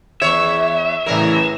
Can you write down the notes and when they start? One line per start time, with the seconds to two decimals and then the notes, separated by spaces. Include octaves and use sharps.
0.22 E2 C#5 E5
1.06 A2 C#3 E3 G3 A#4 A#5